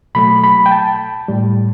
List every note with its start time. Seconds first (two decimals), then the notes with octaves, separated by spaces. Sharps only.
0.15 B2 F#3 A3 B5
0.44 B5
0.66 G5
0.71 A5
1.28 A2 G3